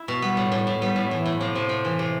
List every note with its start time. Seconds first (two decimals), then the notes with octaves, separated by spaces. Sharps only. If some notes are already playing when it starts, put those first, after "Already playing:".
Already playing: E4
0.08 B2
0.22 G3 B3
0.37 A2
0.52 A2
0.67 A2
0.82 G3 B3
0.96 A2
1.10 A2 E3
1.26 A2
1.40 C3 F3
1.55 C3
1.69 C3
1.85 E3
1.99 C3